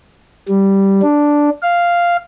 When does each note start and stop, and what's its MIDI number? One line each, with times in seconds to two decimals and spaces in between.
0.48 1.02 55
1.02 1.50 62
1.62 2.17 77